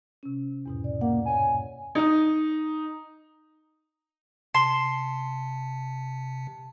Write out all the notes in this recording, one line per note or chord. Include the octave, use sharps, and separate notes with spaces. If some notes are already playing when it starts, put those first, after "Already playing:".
C3 C#4
E2 G#2 B2
D5
A#3 F#5
G2 C#5 G#5
D#4 D#6
C3 A5 C6